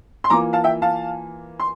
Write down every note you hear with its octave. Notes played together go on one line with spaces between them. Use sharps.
C6
E3 A#3 F4 A#5 D6
F5 A5
E5 G5
F5 A5
C6